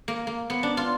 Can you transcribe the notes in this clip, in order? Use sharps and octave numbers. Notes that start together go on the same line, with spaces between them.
A#3
A#3
B3
D4
F4